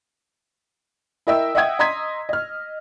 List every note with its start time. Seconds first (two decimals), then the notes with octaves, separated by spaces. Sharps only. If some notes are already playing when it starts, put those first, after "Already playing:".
1.27 E4 A#4 D#5 E5 G5 E6
1.55 D#5 E5 F#5 G5 D#6 G#6
1.79 D#5 A#5 C6 D#6 G#6 B6
2.29 D#5 F6